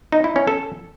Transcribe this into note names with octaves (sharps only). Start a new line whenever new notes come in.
D#4
E4
C#4
A4